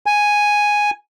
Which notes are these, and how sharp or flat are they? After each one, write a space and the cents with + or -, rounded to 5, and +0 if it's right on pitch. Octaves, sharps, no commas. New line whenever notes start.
G#5 +0